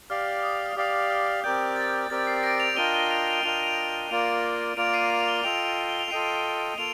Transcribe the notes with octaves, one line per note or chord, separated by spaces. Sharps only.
G4 D5 F5 F6
D#6
F6
G4 D5 F5 D#6
F6
C4 G4 A#4 D5 G5 G6
A6
C4 G4 A#4 D5 G5 A6
C7
A#6 D7
D7 F7
D4 F4 A#4 D#5 G5 D#7 G7
D#7 G7
D7 F7
D7 F7
D4 F4 A#4 D#5 G5 F7
D#7
D7 F7
A#3 F4 A#4 D5 D7 F7
A#3 F4 A#4 D5 D7 F7
C7 D#7
D7 F7
F7
D#7 G7
F4 A4 D#5 G5 D7 F7
G7
F7
F4 A4 D#5 G5 C7 D#7
A#3 F4 A4 D7 F7